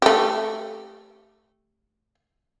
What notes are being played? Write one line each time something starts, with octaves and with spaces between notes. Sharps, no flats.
A3 G4